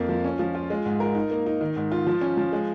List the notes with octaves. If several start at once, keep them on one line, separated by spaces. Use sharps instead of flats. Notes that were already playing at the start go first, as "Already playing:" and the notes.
Already playing: F2 A#3
F3
C#4
F3
F4
G#3
G#2
A#4
D#4
A#3
D#4
D#3
G#2
F4
F3
C#4
F3
G#3